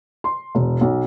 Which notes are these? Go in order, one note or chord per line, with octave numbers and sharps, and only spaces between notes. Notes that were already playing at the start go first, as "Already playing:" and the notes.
C6
E1
B1